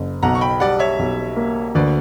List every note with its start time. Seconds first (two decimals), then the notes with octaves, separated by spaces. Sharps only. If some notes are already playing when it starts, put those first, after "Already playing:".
Already playing: F#1
0.23 B1 F#5 A#5
0.35 C#6
0.41 G5 B5
0.60 G3 D5 F#5
0.79 C#5 E5
0.99 B1
1.36 A#3
1.75 D2 B4 D5